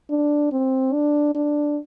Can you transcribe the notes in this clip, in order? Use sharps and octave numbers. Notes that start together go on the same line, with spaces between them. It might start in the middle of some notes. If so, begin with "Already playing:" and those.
D4
C4
D4
D4